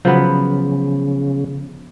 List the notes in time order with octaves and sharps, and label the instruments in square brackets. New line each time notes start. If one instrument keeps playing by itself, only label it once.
[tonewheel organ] C#3 [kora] F3 B3 [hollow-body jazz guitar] F#3 B4 B5